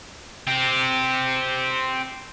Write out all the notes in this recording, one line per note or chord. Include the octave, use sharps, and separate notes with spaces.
C4 G4